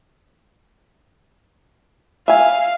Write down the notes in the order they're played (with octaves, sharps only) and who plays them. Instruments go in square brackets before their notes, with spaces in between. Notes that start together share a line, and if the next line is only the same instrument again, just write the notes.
[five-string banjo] E5 G#5 [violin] F5